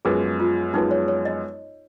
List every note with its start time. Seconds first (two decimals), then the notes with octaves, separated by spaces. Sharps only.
0.05 F#2 F3 G#3 B3 G#4
0.40 F4
0.74 F#2 F3 G#3 B3 D#4
0.91 C#5
1.08 C#5
1.25 D#5